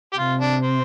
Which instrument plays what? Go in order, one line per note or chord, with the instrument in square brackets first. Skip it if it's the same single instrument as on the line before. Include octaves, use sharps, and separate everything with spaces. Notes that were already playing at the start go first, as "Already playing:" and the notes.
[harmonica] G4
[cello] C3 [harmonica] F4
[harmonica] D4
C4